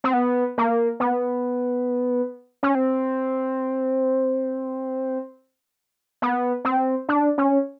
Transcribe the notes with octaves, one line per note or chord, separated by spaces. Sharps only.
C4
B3
A#3
B3
C#4
C4
B3
C4
D4
C#4